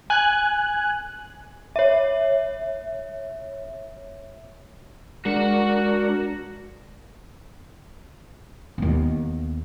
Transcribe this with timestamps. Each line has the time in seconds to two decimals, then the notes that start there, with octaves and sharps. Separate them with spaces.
0.10 G#5 F#6
1.76 C#5 E5
5.25 G#3 D4 F#4 A#4 F#5
8.78 D#2 B3